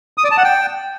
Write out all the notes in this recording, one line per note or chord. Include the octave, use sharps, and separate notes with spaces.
D#6
D5
A5
F#5
G5